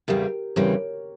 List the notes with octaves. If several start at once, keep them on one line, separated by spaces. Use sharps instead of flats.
E2 C#3 E3 G3 C4 G4 A#4
E2 C#3 E3 G3 C4 A#4 C#5